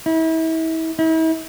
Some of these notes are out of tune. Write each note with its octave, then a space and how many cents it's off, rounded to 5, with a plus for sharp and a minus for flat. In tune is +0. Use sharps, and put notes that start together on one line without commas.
E4 -35
E4 -40